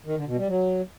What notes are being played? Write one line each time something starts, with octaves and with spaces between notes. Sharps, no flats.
D#3
D3
B2
G3
F#3